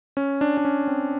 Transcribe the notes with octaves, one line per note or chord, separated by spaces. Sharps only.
C#4
D4
D4
C#4
C4